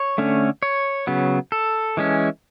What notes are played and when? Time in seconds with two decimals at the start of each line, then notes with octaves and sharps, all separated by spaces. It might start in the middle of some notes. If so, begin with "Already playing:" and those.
Already playing: C#5
0.18 D3 A3 C#4
0.63 C#5
1.07 C#3 F#3 B3
1.52 A4
1.97 E3 G#3 C#4